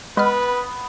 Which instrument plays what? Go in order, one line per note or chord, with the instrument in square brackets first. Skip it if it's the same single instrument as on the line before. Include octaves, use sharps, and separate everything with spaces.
[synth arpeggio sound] G#3 D#5 F6 [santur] B3 [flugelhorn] B4